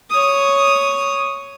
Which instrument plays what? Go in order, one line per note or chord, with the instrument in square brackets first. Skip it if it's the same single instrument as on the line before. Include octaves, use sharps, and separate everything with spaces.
[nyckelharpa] C#5 D#6